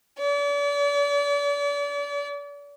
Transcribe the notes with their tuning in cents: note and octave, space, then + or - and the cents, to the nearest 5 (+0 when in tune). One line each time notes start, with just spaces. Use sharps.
D5 -40